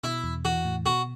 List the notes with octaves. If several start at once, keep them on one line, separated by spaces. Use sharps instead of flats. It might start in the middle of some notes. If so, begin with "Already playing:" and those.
B2 E4
E2
E3 F#4
A2
B2 F#4